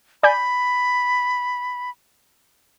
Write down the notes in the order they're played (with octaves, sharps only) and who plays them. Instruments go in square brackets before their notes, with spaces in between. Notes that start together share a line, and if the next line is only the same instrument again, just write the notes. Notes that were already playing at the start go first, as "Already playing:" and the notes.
[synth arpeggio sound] D5 G#5 G6 [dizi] B5